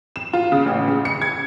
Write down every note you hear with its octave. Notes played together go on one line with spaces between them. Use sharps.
E7
F4
C#3
A1
C#3
C#7
G#6